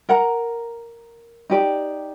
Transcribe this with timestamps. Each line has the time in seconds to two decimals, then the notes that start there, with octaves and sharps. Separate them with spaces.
0.09 A#4 F#5 A#5
1.50 D#4 G4 D5